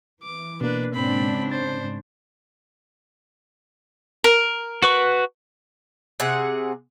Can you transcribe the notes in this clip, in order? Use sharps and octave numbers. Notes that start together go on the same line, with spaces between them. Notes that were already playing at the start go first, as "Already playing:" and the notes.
E3 D6
B2 A#3 D4 B4
G#2 C#3 C4 D4 B5
C5 A6
A#4
F#4 B4 C#6
C3 G#4 F#5